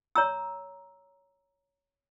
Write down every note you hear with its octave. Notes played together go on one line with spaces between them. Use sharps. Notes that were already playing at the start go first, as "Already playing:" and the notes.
C#5 A#5 E6